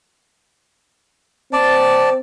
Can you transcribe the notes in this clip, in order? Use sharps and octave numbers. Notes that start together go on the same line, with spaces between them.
C4 D5 A5